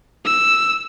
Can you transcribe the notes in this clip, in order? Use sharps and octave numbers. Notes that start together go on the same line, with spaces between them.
E6